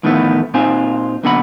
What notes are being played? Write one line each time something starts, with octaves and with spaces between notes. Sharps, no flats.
F2 A2 D#3 E3 A3 B3
A#2 C4 D#4 F4 C5 G#5
B1 A#2 D3 B3 F#5 B5